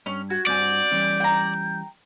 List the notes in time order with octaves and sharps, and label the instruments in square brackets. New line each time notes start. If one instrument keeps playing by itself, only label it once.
[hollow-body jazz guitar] G2 [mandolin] C#4
[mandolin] F#4 [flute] G#6
[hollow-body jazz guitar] G2 C4 G#5 [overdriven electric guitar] D5 [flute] G6
[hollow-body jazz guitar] E3 G3 C#4
[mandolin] G5 A#5